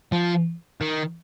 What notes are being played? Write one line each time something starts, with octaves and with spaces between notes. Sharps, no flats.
F3
D#3